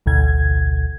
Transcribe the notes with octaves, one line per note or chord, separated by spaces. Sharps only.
A1 D2 B2 G#6